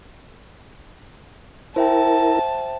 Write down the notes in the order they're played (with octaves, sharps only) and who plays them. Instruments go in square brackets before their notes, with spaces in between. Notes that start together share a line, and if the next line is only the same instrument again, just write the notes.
[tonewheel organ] E4 A#4 [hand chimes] C5 E5 G5 [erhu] A5